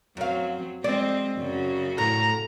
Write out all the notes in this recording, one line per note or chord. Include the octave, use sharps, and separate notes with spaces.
F#2 F#3 C4 F5
G#3 C4 D5
F#2 C#3 F#4
A2 A#5